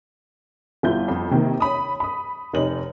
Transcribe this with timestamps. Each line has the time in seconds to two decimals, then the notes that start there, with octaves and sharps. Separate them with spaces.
0.83 G1 E4 F4 G6
1.08 F2
1.31 C3 D#3 A#3
1.60 C#5 B5 D#6
2.00 B5 D#6
2.53 F1 D#4 C#5 F#7